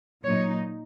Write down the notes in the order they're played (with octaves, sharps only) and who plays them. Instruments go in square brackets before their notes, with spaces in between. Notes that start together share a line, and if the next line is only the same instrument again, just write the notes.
[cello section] A#2 F#3 D#4 C#5